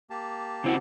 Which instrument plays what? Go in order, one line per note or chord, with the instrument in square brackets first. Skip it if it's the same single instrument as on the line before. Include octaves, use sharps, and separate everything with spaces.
[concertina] A#3 G4 A5
[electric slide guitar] C#3 C4 F#4 [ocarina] E4